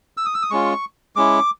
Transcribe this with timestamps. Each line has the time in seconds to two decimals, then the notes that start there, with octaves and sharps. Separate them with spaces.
0.17 E6
0.26 D#6
0.34 E6
0.42 D#6
0.51 G#3 C#4 F4 C#6
1.16 G#3 C#4 E4 D6